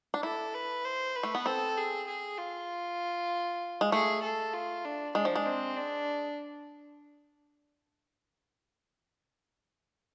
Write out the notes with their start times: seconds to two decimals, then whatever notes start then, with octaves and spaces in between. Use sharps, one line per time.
0.14 D4
0.23 E4 A4
0.54 B4
0.85 C5
1.15 B4
1.23 A3
1.35 B3
1.46 C4 A4
1.77 G#4
2.07 G#4
2.38 F4
3.81 G#3
3.92 A3 G#4
4.23 A4
4.53 F4
4.85 D4
5.15 G#3 D4
5.25 F3
5.35 G#3
5.46 C4
5.77 D4